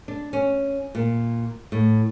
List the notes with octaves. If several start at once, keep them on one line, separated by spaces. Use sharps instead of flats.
D4
C#4
A#2
A2